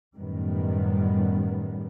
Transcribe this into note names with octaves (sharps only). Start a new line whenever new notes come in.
F#2 A2 D#3 G3 B3